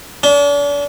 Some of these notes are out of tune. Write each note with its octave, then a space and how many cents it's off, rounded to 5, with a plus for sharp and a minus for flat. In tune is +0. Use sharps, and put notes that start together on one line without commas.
D4 -40